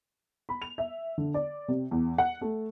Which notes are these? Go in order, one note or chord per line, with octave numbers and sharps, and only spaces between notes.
B5
F7
E5
D3
D5
C3
E2
F#5
A3